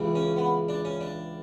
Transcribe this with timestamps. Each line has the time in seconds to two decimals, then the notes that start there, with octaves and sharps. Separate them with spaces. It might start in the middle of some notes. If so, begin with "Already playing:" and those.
Already playing: C#2 C#3 E3
0.15 C#4
0.37 B3
0.68 D4
0.85 C#4
1.01 D4